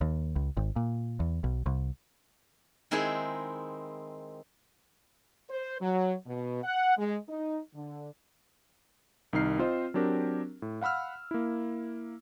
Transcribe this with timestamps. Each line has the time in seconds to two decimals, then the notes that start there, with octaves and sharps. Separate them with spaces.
0.01 D#2
0.36 C#2
0.57 G#1
0.76 A#2
1.20 E2
1.44 B1
1.66 C2
2.91 D#3 G#3 C4 E4 G#4
5.49 C5
5.80 F#3
6.27 B2
6.63 F#5
6.98 G#3
7.29 D#4
7.75 D3
9.33 C2 D#3 D#4 F6 C7
9.58 C4 F4 C5 D#5
9.94 F#3 C4 D4 G4 A#4
10.62 A2
10.82 F5 F#5 B5 E6 F6
11.31 A#3 E4